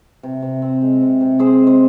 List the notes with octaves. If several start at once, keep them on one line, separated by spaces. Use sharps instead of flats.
C3
C3
C4
G#3
C3
C3
C4 G#4 C5
G#3
C5